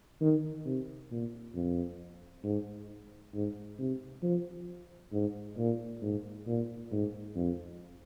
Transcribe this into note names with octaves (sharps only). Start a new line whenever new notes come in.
D#3
C3
A#2
F2
G#2
G#2
C3
F3
G#2
A#2
G#2
A#2
G#2
F2